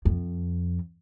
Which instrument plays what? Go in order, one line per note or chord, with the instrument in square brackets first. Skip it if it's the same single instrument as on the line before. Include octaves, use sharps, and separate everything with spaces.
[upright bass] F2